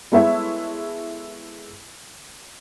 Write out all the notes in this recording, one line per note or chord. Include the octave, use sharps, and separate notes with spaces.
G#3 B3 E4 A4 C#5 E5